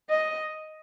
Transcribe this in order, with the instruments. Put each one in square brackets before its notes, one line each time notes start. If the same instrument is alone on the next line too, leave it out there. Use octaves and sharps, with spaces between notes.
[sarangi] D#5